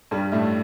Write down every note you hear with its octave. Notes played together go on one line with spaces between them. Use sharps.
G2 G3
A2 A3